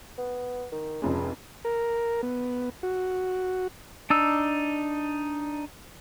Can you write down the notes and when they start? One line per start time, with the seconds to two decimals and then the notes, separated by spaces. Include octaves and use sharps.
0.18 B3
0.72 D#3
1.02 F1 F2 G#3 C#4
1.65 A#4
2.23 B3
2.83 F#4
4.10 D4 D#4 E6